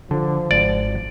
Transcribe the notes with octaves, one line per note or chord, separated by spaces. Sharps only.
D3 F3
G#1 D5